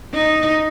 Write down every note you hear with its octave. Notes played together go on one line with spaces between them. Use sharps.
D#4